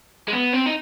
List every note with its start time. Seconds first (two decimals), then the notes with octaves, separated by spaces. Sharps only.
0.28 G#3
0.33 B3
0.53 C4
0.66 D#4